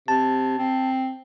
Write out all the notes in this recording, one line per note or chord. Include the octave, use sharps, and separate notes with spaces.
C3 A5
C4